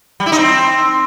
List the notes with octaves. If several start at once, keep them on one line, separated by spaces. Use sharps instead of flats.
G3
E4
D#4
C4